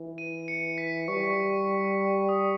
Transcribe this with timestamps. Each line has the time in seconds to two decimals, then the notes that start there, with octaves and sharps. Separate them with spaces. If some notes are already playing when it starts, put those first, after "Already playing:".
Already playing: E3
0.18 D#7
0.48 C#7
0.78 B6
1.08 G3 C#6
2.29 D#6